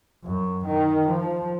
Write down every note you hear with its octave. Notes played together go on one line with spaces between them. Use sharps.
F#2
D#3
F3